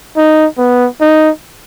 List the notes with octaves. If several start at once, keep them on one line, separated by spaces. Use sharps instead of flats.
D#4
B3
D#4